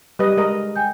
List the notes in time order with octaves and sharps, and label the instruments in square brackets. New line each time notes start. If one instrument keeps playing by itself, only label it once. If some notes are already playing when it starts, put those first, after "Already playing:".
[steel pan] G3 B4 D#5 [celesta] G4
[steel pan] G#3 A#4 D#5
[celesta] G5 G#5 G6